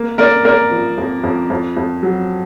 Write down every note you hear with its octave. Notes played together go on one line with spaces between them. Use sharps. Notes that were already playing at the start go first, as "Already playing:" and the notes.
Already playing: A#3
A#3 A#4 D5
A#3 A#4 D5
F3
F2
F2
F2
F2
F#3